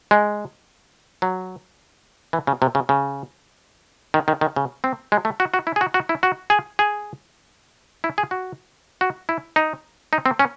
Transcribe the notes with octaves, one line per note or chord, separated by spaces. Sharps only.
G#3
F#3
E3
C#3
C3
C#3
C#3
D#3
D#3
D#3
C#3
C4
G#3
A3
F#4
F#4
E4
G#4
F#4
F#4
E4
F#4
G#4
G#4
E4
G#4
F#4
F#4
E4
D#4
D#4
C4
C#4